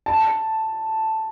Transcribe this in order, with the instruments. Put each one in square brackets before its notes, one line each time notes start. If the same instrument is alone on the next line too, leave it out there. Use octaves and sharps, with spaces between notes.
[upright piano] A5